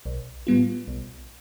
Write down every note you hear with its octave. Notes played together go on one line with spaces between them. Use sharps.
B1
A2 G3 B3 F4
B1